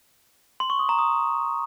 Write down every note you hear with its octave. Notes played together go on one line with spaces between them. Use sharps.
C6
C#6
D#6
A#5
D#6